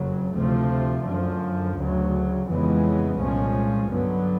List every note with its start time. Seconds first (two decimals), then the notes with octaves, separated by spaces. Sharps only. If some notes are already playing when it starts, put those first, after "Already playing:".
Already playing: F#1 F2 C#3 F#3
0.35 D2 C3 F3 A3
1.06 F#2 D3 F3
1.77 D2 C#3 F#3
2.48 F2 C#3 E3 G#3 B3
3.18 C2 A#2 F3 G#3 C#4
3.89 G2 D3 F#3 B3